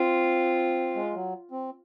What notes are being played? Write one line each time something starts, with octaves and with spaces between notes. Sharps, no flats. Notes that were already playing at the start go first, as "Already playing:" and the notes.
Already playing: C4 F4
G#3
F#3
C4